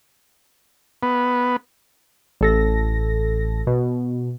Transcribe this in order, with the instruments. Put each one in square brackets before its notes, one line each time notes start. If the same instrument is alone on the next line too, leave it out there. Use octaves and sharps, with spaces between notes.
[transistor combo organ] B3
[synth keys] A1 A4 A#6
B2